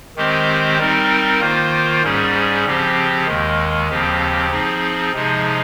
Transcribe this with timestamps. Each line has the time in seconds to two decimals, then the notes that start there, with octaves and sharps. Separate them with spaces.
0.16 D#3 G#3 C4 G4 C5
0.78 G3 C4 D#4 A#4
1.40 D#3 A#3 F4 C5
2.03 G#2 G3 C#4 G#4
2.65 C#3 F3 C4 G4
3.26 D#2 D#3 G#3
3.89 D#2 C#3 F3 C4 G4
4.51 F3 C4 D#4 G#4
5.13 C3 F3 G#3 D#4 G#4